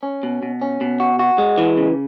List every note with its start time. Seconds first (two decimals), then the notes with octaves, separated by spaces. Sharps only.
0.03 C#4
0.23 B2
0.43 B2
0.61 C#4
0.81 B2
1.00 F#4
1.19 F#4
1.38 G#3
1.58 E3
1.77 C#3